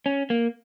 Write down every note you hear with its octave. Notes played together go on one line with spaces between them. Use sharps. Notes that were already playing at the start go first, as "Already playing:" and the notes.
C#4
A#3